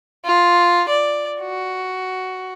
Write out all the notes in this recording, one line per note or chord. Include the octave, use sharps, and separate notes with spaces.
F4
D5
F#4